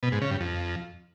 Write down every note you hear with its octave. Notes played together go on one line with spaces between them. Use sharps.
B2
G#2
C#3
G2
F2